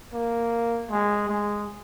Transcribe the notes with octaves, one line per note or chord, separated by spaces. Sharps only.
A#3
G#3
G#3